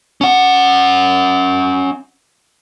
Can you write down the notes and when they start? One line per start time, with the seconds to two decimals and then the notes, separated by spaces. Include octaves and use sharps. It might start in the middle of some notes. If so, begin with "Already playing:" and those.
0.21 C#4 F#5